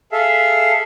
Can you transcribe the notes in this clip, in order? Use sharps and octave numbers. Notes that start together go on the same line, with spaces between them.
G#4 A4 E5 F5